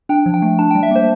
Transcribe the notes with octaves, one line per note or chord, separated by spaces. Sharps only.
D4 G5
F3
G5
A3
D4 A5
G3 G5
E5
A#3 C5